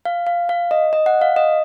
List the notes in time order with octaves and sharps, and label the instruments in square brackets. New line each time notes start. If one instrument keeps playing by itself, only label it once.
[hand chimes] F5
F5
F5
D#5
D#5
F#5
F5
D#5